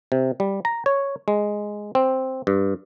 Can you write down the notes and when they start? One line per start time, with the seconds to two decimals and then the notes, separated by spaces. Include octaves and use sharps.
0.12 C3
0.40 G3
0.65 A#5
0.86 C#5
1.28 G#3
1.95 C4
2.47 G2